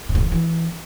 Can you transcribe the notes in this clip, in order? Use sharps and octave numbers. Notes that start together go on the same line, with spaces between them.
A#2
A2
C#3
F3
E3